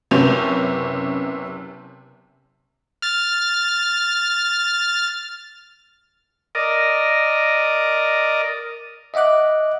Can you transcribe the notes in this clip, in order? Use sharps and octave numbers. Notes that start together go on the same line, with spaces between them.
F#1 C3 B3 C#4 G6 F7
F6 A6
A#4 D5 D#5
D#5 E5 F#5 D6 F#6